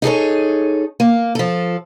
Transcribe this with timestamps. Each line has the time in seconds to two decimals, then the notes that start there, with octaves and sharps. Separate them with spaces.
0.02 D#4 G#4 A4 C#5
1.00 A#3
1.35 F3 A4